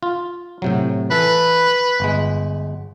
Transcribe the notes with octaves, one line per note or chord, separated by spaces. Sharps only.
F4
A2 C3 F#3
E3 A4 B4
G1 G#3